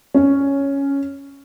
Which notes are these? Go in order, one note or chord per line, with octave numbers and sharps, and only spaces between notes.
C#4